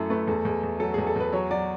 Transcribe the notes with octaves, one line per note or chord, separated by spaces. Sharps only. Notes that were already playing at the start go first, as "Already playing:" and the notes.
Already playing: F#2 A3 E4 A4
A3 B4
E2 A4
E2
E2
F#3 A4
E2 G#4
A4
E2 B4
F#3 C#5
F#3 D5